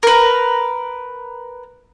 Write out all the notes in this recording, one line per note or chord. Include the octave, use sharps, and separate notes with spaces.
A#4 B4